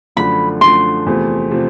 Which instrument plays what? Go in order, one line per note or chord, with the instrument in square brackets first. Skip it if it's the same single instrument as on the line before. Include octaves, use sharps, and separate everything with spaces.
[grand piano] F#2 D3 F3 A3 [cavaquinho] B5
[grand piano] F#2 D3 F3 A3 [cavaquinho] C6
[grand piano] E2 C3 F3 A3 C4
C3 F3 A3 C4